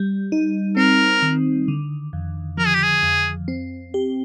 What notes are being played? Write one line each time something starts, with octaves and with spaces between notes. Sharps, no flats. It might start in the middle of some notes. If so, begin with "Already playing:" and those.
Already playing: G3
D#4
C4 A#4
D#3
D3
F2
F3 A#4
G#4
G4
G#4
F2
C4
G4